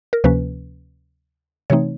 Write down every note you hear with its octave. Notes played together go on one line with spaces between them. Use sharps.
A#4
D2 C3 F3 A#3 C#4 B4
C3 E3 A3 C4 D#4 C#5